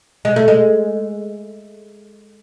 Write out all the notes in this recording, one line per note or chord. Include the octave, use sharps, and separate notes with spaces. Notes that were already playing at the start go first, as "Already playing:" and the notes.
G#3
A3
G#3